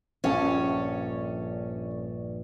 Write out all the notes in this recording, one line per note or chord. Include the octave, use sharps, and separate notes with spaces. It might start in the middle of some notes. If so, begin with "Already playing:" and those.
A#1 G2 C#4 A4 C#5